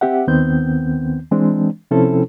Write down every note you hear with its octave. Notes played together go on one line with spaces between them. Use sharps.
C4 G4 E5 F#5
D#2 D#3 B3 C4 G6
E3 G#3 C4 D4
C3 F3 C4 C#4 E4 A4